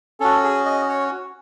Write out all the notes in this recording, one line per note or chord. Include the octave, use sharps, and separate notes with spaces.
C#4 F#4 A4
G#4
D#5
C#5